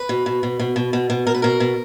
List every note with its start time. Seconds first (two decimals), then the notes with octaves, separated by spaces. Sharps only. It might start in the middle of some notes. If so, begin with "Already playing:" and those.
Already playing: B4
0.09 B2
0.26 B2
0.43 B2
0.60 B2
0.76 B2
0.93 B2
1.10 B2
1.27 B2 A#4
1.35 B4
1.42 B2 A#4
1.60 B2